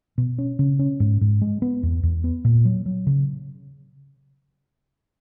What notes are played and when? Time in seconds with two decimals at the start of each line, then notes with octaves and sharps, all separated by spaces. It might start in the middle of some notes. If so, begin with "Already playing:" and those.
0.18 B2
0.38 C#4
0.59 C#3
0.79 C#4
1.00 G#2
1.21 G#2
1.42 G#3
1.62 B3
1.83 E2
2.03 E2
2.24 B3
2.45 A#2
2.65 F#3
2.86 F#3
3.07 C#3